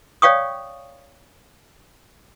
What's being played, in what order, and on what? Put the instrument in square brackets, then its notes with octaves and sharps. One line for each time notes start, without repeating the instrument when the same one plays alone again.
[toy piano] C#5 D5 F5 G5 C#6 D#6